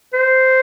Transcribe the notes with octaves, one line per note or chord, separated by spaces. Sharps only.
C5